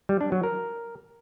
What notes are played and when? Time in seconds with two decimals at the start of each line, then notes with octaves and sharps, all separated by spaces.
0.09 G3
0.21 D4
0.32 F#3
0.43 A#4